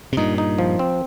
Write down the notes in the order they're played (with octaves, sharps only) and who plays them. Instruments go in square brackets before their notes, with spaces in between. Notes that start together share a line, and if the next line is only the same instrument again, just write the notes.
[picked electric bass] C3
[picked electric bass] G2 A#2 [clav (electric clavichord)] D#4
[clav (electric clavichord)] D#4
F3
C4